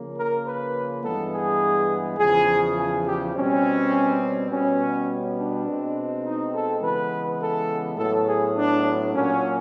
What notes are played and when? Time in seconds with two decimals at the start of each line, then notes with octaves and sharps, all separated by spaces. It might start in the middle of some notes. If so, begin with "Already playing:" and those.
Already playing: C#3 F3 A#3
0.15 A#4
0.45 B4
1.03 G2 E3 G#3 B3 A4
1.32 G#4
2.18 E2 C#3 F3 G#4
2.76 G#4
3.04 G4
3.34 B2 G3 C4 C#4
4.49 B2 G3 B3 C#4
5.37 D4
5.65 B2 G#3 C4
6.24 D#4
6.53 A4
6.81 C#3 E3 G#3 B3 B4
7.39 A4
7.97 A2 F#3 B3 A4
8.26 G#4
8.55 D4
9.12 A#2 F#3 A#3 C#4